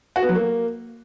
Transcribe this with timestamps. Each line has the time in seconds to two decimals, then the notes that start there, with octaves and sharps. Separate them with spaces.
0.16 F#4
0.22 B3
0.29 F#3
0.35 A#3